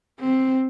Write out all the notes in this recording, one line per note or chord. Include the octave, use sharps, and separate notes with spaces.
C4